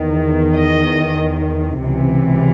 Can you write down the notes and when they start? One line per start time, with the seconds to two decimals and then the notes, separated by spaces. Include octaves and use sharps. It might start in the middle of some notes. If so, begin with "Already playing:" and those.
Already playing: E2 D#3
0.56 D#5
1.83 C#2 C3 E3